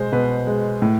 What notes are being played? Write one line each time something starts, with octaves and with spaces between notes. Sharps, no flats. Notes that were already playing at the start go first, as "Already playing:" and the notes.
Already playing: B2 G#3 C5
B2 B4
G#3
A2